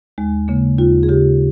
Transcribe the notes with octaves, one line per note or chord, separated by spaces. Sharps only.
D#2 G#3
C#3 A#3
D#2 F4
G#4
C#3 G4